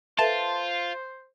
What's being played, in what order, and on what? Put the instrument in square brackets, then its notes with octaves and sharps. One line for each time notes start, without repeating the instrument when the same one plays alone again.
[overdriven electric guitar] F4 [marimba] A4 B4 E5 [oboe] C5 [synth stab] A5